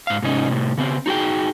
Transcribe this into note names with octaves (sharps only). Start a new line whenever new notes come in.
G#2 F5
G#2 C3 C#4 D#4
A2 C3
C#3 B3 C4
D#4 F#4 G#4 G5